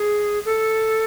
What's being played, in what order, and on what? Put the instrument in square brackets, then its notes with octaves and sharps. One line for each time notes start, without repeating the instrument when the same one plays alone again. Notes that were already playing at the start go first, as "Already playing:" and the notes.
Already playing: [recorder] G#4
A4